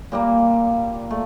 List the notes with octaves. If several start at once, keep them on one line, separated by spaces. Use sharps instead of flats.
A#2 G3 A#3
A3